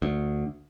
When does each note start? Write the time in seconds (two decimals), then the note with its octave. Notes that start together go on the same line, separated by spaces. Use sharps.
0.02 D2